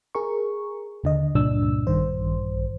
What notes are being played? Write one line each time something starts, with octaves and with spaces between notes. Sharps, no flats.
G#4 A#4 C#6
D#2 D3 D#5
C#2 G2 A#2 D4 E6
A#1 G2 D#3 C5